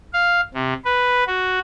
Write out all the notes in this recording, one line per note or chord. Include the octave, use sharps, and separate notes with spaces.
F5
C3
B4
F#4